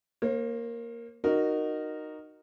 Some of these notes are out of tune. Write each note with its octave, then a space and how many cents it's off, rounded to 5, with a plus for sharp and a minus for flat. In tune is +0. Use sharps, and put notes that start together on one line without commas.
A#3 +0 C5 +45
D#4 -15 F#4 +0 A#4 +0